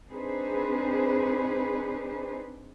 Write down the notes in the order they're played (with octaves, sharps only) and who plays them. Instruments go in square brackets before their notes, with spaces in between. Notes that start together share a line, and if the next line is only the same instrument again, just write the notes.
[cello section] C4 D4 D#4 G#4 B4 C5